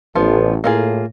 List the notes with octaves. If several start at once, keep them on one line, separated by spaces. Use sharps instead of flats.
A1 F3 B3
A2 A#3 F4 G#4